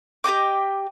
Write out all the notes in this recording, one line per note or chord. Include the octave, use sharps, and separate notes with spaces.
G4 D#5 G5 D6